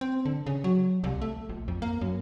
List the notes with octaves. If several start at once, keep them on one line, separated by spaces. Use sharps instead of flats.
C4
D3
C#3
F#3
C2
A3
A#1
F2
A#3
F#2